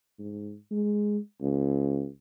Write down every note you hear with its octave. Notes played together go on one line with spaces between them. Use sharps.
G#2
G#3
C#2